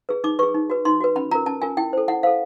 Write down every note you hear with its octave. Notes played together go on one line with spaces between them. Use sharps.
G#4 B4
D#4 D6
G#4 B4 C#6
D#4
F#4 B4
D#4 C6
F#4 B4
C#4 B5
F4 A#4 A#5
C#4 A5
F4 A#4 G#5
E4 G5
A4 C5
E4 F#5
A4 C5 F5